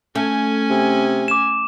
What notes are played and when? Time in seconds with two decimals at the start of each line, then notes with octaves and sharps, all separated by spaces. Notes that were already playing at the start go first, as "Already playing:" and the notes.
0.15 A3 C#4 G#5
0.70 C3
1.28 D6 E7